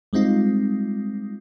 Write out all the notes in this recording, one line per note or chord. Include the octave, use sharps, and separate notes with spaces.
G3 G#3 C4 D#4 F4